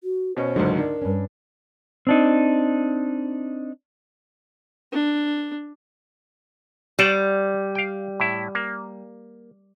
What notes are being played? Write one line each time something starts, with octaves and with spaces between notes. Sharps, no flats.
F#4
B2 C#4 C5
C#2 G#2 D3 F#3 A3 A#3
D4 D#4 A#4
G2 C#4
C4 D4 D#4
D4
G3 C5 D5 F#5
F5 G5
A2 E4
A#3